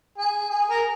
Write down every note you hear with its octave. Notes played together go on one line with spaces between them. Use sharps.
G#4
G#4
A#4